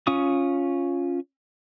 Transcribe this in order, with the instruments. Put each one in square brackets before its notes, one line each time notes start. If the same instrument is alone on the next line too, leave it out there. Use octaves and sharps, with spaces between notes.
[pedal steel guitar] C#4 F4 C#6 D#6